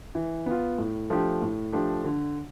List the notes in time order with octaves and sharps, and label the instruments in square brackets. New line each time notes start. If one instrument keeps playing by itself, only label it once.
[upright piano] E3
B3 F4
A2
F3 A3 D4 G4
A2
F3 A3 D4 G4
D3